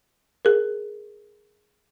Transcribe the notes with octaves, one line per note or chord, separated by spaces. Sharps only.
G#4 A#4